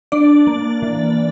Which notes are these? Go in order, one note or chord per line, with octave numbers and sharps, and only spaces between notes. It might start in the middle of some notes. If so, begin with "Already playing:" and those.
D4 D5
A#3
E3